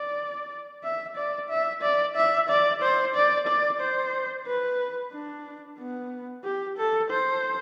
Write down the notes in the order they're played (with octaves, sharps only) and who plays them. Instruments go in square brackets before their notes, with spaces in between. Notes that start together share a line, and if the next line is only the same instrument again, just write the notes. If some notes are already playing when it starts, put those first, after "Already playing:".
Already playing: [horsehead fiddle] D5
E5
D5
E5
D5
E5
D5
C5
D5
D5
C5
B4
D4
B3
G4
A4
C5